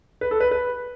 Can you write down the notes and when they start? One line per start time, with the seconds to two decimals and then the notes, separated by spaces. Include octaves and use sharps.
0.21 B4
0.31 A4
0.40 B4
0.51 B4